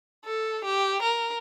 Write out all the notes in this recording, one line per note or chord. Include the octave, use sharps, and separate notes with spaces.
A4
G4
A#4